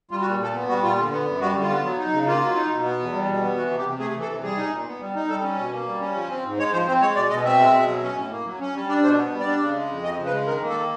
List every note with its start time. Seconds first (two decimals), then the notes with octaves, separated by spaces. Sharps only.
0.11 G3 F4
0.21 F#4
0.26 A#2
0.40 A#2 A4
0.54 B3
0.69 G3 F#4
0.83 A#2 F4
0.98 D3
1.12 B3
1.26 F#2
1.41 G3 F#4
1.54 D3
1.63 F4
1.69 B3
1.84 F#3
1.98 D#4
2.13 C#3
2.27 A#3 F4
2.41 F#3
2.55 D#4
2.70 B2
2.84 B3
2.99 E2
3.13 G3
3.28 B2
3.42 B3
3.56 E3 F#4
3.71 C3
3.78 G4
3.85 C3
3.99 A3 G#4
4.14 E3
4.21 A4
4.28 C3
4.43 G3 G#4
4.57 D#4
4.71 A#2
4.86 B3
5.00 G3
5.15 D#4
5.29 G3 A4
5.43 C#4
5.58 B2
5.72 A#3
5.86 G3
6.01 C#4
6.15 F3
6.30 C4
6.45 G#2
6.58 G#3 C#5
6.73 F3 C5
6.87 C4 C5
7.02 G#3 C#5
7.16 B2 D5
7.30 B2 D#5
7.45 C4 E5
7.59 G#3
7.73 B2
7.88 F#3
8.02 C#4
8.17 A2
8.31 A#3
8.45 F#3
8.60 C#4
8.74 G3
8.88 D4 D5
9.03 B2 C5
9.18 B3
9.32 G3
9.39 D5
9.46 D4
9.61 C#3
9.75 G#3
9.89 F2
10.04 F3 D#5
10.18 C#3
10.26 B4
10.33 G#3
10.47 D#3 A#4
10.62 A#3
10.69 A4